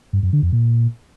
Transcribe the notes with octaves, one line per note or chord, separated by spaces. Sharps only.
G2
F#2
D3
F2
A#2